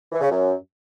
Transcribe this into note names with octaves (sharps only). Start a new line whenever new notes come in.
E3
C#3
F#2